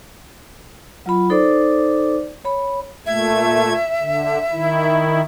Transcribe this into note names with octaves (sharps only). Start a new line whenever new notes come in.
F#3 F4 B5
D#4 A4 C5 D5 D6
C#5 B5
A#2 A3 E5 G#6
D3
D#3 E4